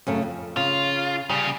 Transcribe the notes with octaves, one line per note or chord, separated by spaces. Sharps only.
F#2 C#3 A3
F2
C#3 F4
C2 C#3 G3